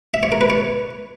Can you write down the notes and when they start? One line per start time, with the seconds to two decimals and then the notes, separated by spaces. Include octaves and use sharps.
0.14 E5
0.23 C#5
0.32 A#4
0.41 B4
0.50 C#5